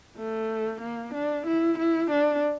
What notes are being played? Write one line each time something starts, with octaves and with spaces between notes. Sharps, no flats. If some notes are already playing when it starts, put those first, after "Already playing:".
A3
A#3
D4
E4
E4
D4